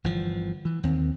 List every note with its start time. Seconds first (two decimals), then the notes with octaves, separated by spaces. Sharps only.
0.04 G1 E3 F3
0.65 E3
0.83 D#2 D#3 C4